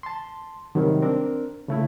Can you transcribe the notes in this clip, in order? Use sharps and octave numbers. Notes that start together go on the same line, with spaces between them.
A5 C6
C3 D#3 F#3 G3 C#4
C4 D4 A#4
C#3 A3 E4